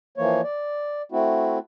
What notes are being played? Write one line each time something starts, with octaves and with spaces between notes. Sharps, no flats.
E3 F3 A#3 C#5
D5
A3 C4 E4 F#4